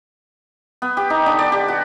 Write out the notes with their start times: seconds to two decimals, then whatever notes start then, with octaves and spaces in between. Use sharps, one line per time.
0.82 B3
0.97 G4
1.10 D#4
1.26 D3
1.39 D5
1.52 G4
1.68 F#4